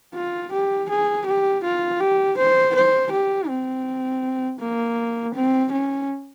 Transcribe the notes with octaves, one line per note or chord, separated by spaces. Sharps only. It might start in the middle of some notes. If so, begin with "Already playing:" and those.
F4
G4
G#4
G4
F4
G4
C5
C5
G4
C4
A#3
C4
C#4